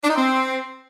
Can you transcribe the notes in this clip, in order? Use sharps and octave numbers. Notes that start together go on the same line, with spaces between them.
D4
D#4
C4